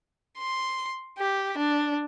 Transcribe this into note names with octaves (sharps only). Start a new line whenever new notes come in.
C6
G4
D4